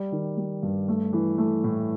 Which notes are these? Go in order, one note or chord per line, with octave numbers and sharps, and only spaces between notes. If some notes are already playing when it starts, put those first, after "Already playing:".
Already playing: G3
D#3
G3
G2
A3
E3
A3
A2